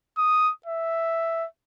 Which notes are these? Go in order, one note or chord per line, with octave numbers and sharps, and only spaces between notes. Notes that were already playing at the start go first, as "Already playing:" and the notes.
D#6
E5